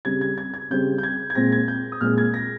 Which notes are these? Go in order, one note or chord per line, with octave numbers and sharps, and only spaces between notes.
C#3 G3 C4 G#6
G#6
G#6
G#6
C#3 G3 C4 G6
G6
G#6
G#6
A#2 G#3 C4 A#6
G#6
G6
D#6
A#2 G#3 C4 F6
G#6
A#6